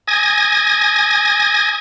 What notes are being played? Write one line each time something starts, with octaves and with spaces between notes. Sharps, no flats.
G#5 D#6 G#6 A#6